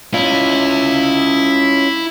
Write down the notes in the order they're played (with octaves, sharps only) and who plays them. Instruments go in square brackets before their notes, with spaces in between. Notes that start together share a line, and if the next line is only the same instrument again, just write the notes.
[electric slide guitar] C#4 F4 [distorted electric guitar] E4